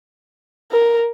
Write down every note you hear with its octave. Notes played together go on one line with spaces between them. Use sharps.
A#4